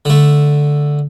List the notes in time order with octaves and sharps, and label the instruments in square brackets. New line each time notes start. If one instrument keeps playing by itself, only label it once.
[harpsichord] D3 A3